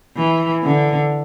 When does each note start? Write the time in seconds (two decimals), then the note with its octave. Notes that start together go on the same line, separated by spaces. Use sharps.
0.17 E3
0.64 D3